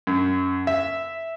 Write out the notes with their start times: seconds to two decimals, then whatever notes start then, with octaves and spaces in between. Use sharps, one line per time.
0.07 F#2
0.67 E5